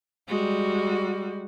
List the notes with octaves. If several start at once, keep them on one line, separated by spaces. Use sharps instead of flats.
G3 G#3 F#4